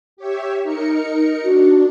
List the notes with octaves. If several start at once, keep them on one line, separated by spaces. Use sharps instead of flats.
G4 C#5 E5
D#4 A#4 C#7
D4 F#4